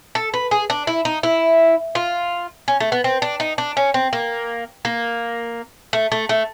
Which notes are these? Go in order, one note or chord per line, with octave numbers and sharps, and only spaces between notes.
A4
B4
G#4
D4
E4
D#4
E4
F4
C#4
A3
B3
C4
D4
D#4
D4
C#4
C4
A#3
A#3
A3
A3
A3